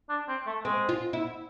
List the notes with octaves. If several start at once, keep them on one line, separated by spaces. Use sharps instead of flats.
D4
C4
A3
G#3 C4
F4
E4